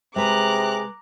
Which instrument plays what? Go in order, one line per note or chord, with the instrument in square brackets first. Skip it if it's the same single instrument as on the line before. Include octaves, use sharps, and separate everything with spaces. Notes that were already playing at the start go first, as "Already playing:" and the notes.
[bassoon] C3 [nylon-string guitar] G#3 B4 [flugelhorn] G#4 [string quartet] A#5 D6 F#6